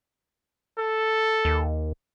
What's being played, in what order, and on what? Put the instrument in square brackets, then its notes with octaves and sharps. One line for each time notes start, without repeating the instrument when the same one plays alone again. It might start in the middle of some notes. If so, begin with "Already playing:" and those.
[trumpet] A4
[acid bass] D#2